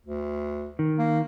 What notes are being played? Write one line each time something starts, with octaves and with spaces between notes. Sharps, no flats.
D2
D#3
A#3